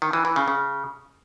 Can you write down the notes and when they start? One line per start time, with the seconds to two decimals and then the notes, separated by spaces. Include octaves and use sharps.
0.02 D#3
0.13 E3
0.25 E3
0.36 C#3
0.48 C#3